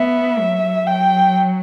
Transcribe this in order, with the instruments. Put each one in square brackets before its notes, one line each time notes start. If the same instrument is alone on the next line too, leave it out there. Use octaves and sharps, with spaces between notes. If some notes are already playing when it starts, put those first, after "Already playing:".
Already playing: [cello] B3 [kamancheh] E5
[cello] F#3
[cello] F#3 [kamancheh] G5